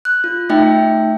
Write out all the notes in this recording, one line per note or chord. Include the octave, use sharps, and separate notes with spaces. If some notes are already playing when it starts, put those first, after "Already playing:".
F#6
F4
A3 D#4 E5 G5